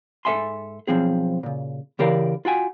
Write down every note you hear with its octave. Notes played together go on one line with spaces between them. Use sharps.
G#2 A4 D#5 E5 G#5 C6
B1 B2 F3 C4 G#4
A#2 C#3
C#3 E3 G4 A#4 D5 F5
F4 F#4 G5 G#5